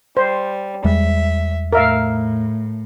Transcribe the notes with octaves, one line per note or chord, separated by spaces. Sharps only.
G3 C5
E2 G3 G#3 E5
A2 A#4 E5 F5